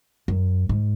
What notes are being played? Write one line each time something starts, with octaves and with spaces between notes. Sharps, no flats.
F#2
G#2